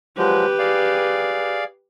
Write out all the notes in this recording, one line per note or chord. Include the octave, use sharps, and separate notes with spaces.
F3 F#3 G#3 G4 B4
G#4 D5 F5